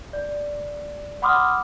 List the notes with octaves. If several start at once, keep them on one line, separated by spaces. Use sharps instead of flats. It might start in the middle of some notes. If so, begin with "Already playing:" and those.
D5
F#5 B5 C6 D6 D#6 F6